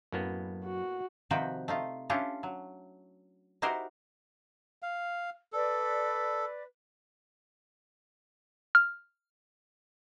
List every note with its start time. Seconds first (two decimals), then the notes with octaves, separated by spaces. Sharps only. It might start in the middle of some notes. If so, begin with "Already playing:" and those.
0.12 F#2 A2 A#3 B3
0.65 F#4
1.31 C3 D#3 F3 F#4 B4 G5
1.68 A3 D#4 F4
2.10 C#4 D4 E4 F4 G4
2.43 F#3
3.62 D#4 E4 F#4 G4 A#4 C5
4.83 F5
5.53 A4 B4 D5
8.75 F6